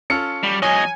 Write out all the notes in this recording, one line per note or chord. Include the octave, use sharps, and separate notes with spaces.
C#4 F4 A4 F6 C#7
G3
E2 F#3 C#5 D#5 G#5